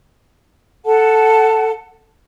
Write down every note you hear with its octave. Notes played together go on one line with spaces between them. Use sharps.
A4 F#5 A5